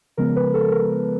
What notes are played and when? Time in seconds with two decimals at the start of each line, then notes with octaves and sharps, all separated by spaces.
0.17 C#3 F3 G#3 B3 A#4
0.36 B4
0.54 A4
0.72 A#4